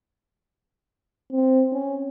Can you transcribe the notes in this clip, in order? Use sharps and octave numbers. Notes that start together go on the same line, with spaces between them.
C4
C#4